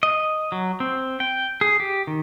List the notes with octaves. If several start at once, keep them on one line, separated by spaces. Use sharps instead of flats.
D#5
F#3
C4
G5
G#4
G4
D#3